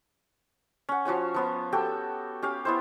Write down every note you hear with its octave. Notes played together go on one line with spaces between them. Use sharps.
C#4 F#5
F3 F#4 C#5 G#5
F3 B3 F5
F#4 G4 A4 G5
C#4 G4 F5
B3 E4 C5